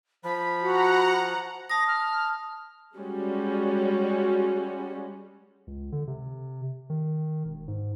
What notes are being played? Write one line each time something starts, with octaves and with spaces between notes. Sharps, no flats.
F3 B5
F#4 F#5 A#5
A5 D#6 A#6
F6
G3 G#3 C#4 F#4
C#2
D3
C3
D#3
E1
G#2